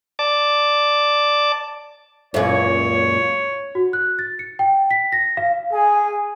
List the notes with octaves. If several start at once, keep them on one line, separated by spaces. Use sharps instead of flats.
D5 A5 D6
C#2 F#2 A#2 C#5
F#4
F#6
A6
C#7
G5
B6
A#6
F5
G#4 G#5